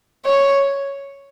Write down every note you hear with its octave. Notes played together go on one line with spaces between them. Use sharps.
C#5